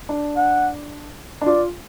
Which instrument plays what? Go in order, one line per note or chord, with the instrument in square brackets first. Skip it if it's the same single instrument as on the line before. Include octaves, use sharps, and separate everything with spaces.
[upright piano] D4
[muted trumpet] F#5
[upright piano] D4
[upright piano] F4 [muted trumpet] D5